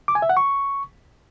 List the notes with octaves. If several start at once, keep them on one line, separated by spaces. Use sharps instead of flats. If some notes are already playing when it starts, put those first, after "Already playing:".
D6
G#5
E5
F#5
C#6